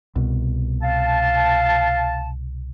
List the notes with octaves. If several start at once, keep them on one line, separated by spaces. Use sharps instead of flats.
C2 B2
F5 A5